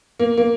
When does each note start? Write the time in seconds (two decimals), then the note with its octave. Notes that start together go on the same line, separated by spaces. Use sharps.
0.19 A#3
0.37 A#3